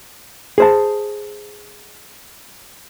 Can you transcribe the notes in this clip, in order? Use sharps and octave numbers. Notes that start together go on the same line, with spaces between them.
G#4 C5 A5